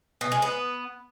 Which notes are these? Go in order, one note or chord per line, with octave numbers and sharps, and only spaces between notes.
B2
G#3
B3